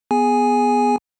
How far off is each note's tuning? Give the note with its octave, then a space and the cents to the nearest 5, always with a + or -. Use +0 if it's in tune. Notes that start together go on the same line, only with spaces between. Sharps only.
B3 +0 G#4 +0 G#5 +0